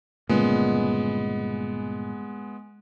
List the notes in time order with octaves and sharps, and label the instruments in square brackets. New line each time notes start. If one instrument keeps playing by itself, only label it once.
[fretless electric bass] G1 A#2 C#3 [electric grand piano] G#3 B3